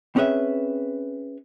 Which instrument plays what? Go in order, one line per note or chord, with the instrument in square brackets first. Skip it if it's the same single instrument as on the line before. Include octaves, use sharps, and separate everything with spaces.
[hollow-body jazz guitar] C4 C#4 G#4 B4 E5